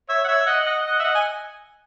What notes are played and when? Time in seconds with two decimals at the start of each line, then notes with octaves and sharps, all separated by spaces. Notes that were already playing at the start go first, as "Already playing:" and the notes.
0.09 C#5 E5
0.24 F#5
0.28 C#5 E5
0.46 D#5 F#5
0.65 D#5 F#5
0.85 D#5 F#5
1.00 E5
1.04 D#5 F#5
1.15 G#5